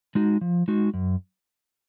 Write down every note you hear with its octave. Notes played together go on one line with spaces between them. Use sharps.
G#3 D#4 F#4
F3
G#3 D#4 F#4
F#2